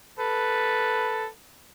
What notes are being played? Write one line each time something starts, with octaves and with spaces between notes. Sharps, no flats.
A4 B4